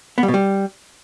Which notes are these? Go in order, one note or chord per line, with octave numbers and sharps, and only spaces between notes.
B3
G3
B2
G3